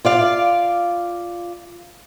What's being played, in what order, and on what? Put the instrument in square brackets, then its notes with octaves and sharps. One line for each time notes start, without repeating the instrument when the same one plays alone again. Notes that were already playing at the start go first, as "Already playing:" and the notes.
[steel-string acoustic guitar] F4 D5 F5